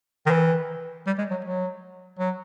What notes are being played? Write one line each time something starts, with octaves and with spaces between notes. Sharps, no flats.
D#3
E3
G3
G#3
F#3
F#3
F#3